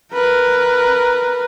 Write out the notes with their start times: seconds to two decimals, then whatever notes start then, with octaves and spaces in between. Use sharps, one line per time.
0.13 A#4 B4